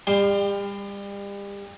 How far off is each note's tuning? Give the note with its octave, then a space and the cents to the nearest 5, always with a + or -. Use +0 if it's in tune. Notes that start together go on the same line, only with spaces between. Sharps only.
G3 +35 G5 +15 C6 +0